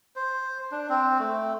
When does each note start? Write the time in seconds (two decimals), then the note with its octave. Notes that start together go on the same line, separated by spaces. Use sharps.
0.16 C5
0.72 D4
0.90 C4
1.19 A3